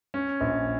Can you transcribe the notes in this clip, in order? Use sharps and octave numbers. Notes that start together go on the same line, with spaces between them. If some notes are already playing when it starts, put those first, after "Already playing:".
C#4
A#1